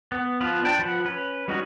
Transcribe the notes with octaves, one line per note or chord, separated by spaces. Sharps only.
B3
F3 B3 F4 B4
D4 G5 A5
F3 B4 F#5
C#4 B4
G3 G#3 C#4 D#4 F#4